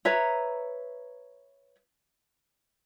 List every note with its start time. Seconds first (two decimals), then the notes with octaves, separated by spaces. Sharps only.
0.05 B4 C#5 E5 A#5